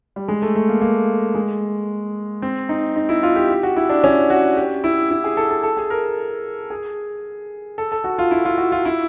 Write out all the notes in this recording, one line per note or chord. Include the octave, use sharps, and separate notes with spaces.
G3
G#3
A3
A3
A#3
A#3
G#3
C4
D#4
D#4
E4
F4
G4
G4
F#4
E4
D4
C#4
F#4
G4
E4
E4
G#4
A4
A4
A4
G#4
A#4
G#4
A4
A4
F#4
F4
E4
F4
F#4
F4
E4